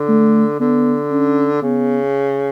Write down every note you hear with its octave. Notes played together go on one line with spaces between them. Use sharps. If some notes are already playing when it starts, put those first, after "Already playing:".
Already playing: D3
A3
D3 B3
C#4
C#3 B3